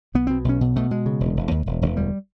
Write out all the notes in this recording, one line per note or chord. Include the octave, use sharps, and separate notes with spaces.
B1 B3
B2 C4
B1 C#4
B2
B2 A3
B2 G#3
C#3
E1
E1
D#2
E1
E1
D2 G3